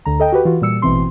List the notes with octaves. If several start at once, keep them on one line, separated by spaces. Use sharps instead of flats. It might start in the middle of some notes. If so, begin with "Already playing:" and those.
D2 D3 A#5
A4 D#5 G5
F#4 G4 B4
E3 F4 F#4
A#2 G3 E6 C#7
A1 B2 E3 C4 C6